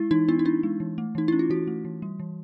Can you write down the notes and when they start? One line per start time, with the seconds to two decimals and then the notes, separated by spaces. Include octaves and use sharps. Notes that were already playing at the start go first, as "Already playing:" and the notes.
Already playing: G#3 E4
0.11 E3 D#4
0.28 B3 E4
0.39 D#4
0.45 D4 E4
0.63 G#3
0.80 E3
0.98 A3
1.15 E3 D#4
1.28 C#4 E4
1.39 F4
1.50 E3 F#4
1.67 A3
1.85 E3
2.02 G3
2.20 E3